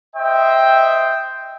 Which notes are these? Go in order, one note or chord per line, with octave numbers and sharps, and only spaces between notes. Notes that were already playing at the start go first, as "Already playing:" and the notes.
C5 D#5 E5 G5